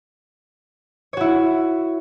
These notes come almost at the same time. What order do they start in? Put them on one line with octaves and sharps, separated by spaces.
C#5 F#4 E4